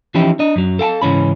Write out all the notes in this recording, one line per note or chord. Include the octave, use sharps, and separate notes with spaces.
E3 F3 C#4 D#4 E4 G4
D4 D#5
F#2 F#3
A4 F5 G5 A5
G#2 C#3 E3 C#4 B5